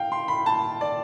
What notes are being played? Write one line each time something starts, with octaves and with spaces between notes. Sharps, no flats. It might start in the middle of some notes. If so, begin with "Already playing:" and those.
Already playing: F5 G5
C6
B5
A5
D5